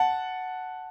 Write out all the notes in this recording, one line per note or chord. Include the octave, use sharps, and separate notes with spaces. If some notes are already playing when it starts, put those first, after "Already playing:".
Already playing: F#5 A5